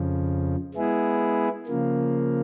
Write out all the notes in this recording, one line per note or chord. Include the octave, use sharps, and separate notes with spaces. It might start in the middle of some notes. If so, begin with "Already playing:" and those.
Already playing: F2 C#3 F3
G#3 B3 E4 G#4
C#3 F3 A#3